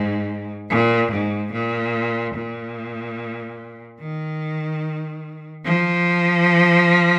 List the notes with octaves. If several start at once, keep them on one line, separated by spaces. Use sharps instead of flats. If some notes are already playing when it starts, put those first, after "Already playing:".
Already playing: G#2
A#2
G#2
A#2
A#2
D#3
F3